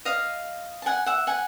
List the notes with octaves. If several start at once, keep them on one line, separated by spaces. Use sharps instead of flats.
D#5 F5
A5
F#5 G#5
E5 F#5
F#5 G#5